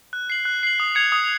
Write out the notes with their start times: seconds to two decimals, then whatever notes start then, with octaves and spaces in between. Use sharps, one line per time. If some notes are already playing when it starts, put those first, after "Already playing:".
0.13 F#6
0.30 C7 F#7
0.45 F#6
0.63 C7 F#7
0.80 D#6
0.95 G#6 C#7 F7
1.12 D#6